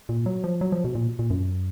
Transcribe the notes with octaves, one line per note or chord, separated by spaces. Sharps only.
A#2
F#3
F3
F#3
F3
B2
A#2
A#2
F#2